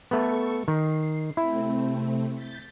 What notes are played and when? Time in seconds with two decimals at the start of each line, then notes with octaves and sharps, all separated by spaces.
0.11 A3 B3 A4 C#6
0.68 D#3 C7
1.37 C3 A3 C4 E4
2.34 G6 A6 B6